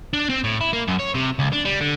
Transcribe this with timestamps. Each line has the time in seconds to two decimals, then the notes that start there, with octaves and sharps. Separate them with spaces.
0.13 D4
0.29 C4
0.44 A2
0.61 E4
0.73 A#3
0.88 F#2
1.00 C#5
1.15 C3
1.39 C#2
1.53 D4
1.65 G3
1.81 D3